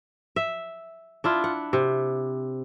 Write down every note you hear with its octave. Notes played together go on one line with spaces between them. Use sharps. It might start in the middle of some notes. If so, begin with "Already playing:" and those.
E5
D4 E4 F4
F#5
C3